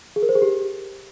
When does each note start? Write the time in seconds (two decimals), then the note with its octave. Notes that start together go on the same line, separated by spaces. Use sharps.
0.16 G#4
0.22 A#4
0.29 C5
0.35 G#4
0.42 G4